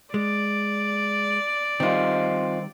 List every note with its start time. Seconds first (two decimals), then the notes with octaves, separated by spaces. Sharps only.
0.14 G#3 D5
1.80 D#3 G3 C4 D#4 F4